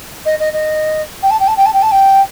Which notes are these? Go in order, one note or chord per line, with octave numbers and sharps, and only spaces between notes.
D#5
D#5
D#5
G5
A5
G5
A5
G5
A5
G5
A5
G5